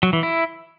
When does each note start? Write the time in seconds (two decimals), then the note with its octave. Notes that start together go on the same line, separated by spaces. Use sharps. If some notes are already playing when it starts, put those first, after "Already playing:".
0.03 F#3
0.13 E3
0.23 E4